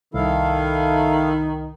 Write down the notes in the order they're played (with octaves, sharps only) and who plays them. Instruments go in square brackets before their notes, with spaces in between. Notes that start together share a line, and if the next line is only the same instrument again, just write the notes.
[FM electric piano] C2 [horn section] D#3 [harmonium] E4 A4 F5